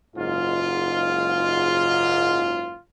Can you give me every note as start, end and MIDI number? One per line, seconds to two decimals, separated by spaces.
0.16 2.75 30
0.16 2.75 44
0.16 2.75 65